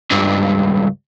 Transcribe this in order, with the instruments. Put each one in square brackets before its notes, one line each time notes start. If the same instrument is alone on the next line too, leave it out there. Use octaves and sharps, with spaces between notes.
[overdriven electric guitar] C#2 G2